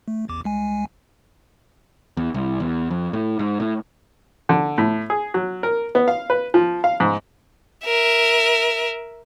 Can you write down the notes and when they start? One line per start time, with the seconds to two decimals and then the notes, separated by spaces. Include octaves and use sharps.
0.08 A3
0.28 A1 E2 D6
0.44 C2 G#3 G#5
2.17 E2
2.34 C2
2.60 E2
2.90 F2
3.13 A2
3.39 G#2
3.60 A2
4.49 D3
4.78 A2
5.10 G#4
5.34 F#3
5.63 A#4
5.95 B3
6.08 F5
6.30 B4
6.54 F3
6.84 F5
7.00 G#2
7.86 A#4 E5